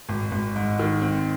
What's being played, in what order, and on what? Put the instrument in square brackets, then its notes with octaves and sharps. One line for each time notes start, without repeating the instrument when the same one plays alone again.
[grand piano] G#1
G#1
G#2
D#3
C4